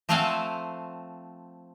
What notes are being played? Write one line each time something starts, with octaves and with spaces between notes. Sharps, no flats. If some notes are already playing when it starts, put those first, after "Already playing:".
F3 A3 C4 F5 F#5 G#5